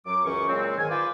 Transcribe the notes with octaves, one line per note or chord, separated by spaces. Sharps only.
F#2 F#3 D6
C#2 F#2 E3 C#4 C#6
A#2 C#3 F#3 G#3 C4
G#2 D#3 G#5
F4 B4 C5 D5